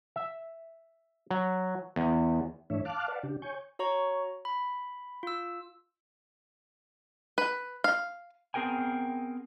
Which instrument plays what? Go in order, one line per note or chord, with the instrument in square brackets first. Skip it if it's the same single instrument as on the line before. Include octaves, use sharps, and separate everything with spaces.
[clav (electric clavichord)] E5
F#3
E2
[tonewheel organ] G#2 E3 A3 D4 C#5 E5
F5 A5 D6 F6 F#6
B4 D5 F5 F#5 A5
C#3 D4 G4
C#5 G#5 C#6 G6
[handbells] F#4 C#5 A#5 C#6
B5
F4 E6
[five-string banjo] B4
F5
[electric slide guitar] B3 C4 G#4 A#4 G5 G#5